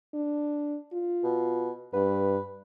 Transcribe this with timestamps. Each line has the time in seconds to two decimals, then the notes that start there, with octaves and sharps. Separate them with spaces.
0.14 D4
0.93 F4
1.24 B2
1.94 G2 B4